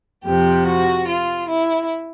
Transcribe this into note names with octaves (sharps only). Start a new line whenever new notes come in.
F2 C3 F3 G4
F#4
F4
E4